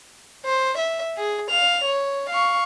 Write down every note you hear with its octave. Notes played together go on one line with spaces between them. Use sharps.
C5
E5
G#4
F5 F7
C#5
F5 C#6